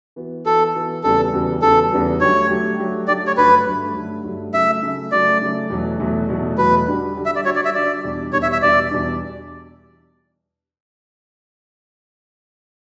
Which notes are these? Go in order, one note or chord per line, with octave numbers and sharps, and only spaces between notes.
E3 B3 F#4
E3 B3 F#4 A4
E3 B3 F#4
E2 C#3 G3 B3 F#4 A4
E2 C#3 G3 B3 F#4
E2 C#3 G3 B3 F#4 A4
E2 C#3 G3 B3 F#4
D3 F#3 A3 D4 G4 C#5
D3 F#3 A3 D4 G4
D3 F#3 A3 D4 G4
D3 F#3 A3 D4 G4 D5
C#5
G2 D3 F#3 A3 B4
G2 D3 F#3 A3
G2 D3 F#3 A3
G2 D3 F#3 A3
C#3 F#3 A3 E5
C#3 F#3 A3
C#3 F#3 A3 D5
C#3 F#3 A3
E2 B2 F#3 A3
E2 B2 F#3 A3
E2 B2 F#3 A3
E2 B2 F#3 A3 B4
D3 G3 D4 F#4
D3 G3 D4 F#4
E5
D5
D3 G3 D4 F#4 C#5
D5
E5
D3 G3 D4 F#4 D5
E2 B2 G3 D4
E2 B2 G3 D4 C#5
E5
E5
E2 B2 G3 D4 D5
E2 B2 G3 D4